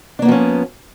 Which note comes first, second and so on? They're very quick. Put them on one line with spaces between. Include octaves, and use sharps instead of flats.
D4 A#3 B3 F3 C#4